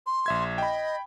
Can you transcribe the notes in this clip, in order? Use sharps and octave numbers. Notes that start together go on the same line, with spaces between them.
C6
A#1 E5 G#6
D#5 G5 B5